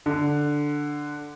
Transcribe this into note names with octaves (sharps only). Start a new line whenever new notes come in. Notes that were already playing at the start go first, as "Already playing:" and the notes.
D3